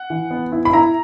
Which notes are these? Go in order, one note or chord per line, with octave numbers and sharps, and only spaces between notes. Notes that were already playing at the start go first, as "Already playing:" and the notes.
Already playing: F#5
E3
B3
E4
B5
E4 A#5